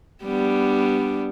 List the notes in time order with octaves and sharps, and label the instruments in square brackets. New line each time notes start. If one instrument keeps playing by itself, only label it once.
[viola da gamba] G3 B3 D4